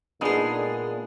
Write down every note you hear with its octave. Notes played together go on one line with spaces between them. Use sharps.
A#2 G#3 B3 D4 D#4 G#4